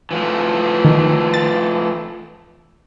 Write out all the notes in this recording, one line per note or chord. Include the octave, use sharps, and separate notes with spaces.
E3 F3 A3
D#3
A6